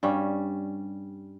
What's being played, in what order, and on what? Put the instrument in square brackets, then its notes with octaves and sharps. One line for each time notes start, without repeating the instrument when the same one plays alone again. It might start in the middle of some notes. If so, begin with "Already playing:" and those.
[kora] G2 G3 C#4